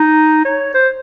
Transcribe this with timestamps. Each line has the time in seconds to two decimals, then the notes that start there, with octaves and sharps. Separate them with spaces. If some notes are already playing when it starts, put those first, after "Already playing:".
Already playing: D#4
0.45 C#5
0.74 C5